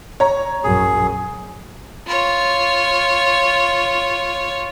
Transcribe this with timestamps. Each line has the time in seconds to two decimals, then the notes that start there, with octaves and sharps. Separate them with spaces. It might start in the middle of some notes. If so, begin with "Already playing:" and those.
0.20 C#5 A#5
0.64 A#1 F#2 G#4
2.07 F4 C#5